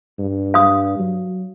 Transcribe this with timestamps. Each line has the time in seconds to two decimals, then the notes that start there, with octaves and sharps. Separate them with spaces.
0.18 G2
0.54 F5 D#6
0.99 F#3